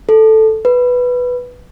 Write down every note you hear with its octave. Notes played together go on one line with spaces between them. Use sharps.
A4
B4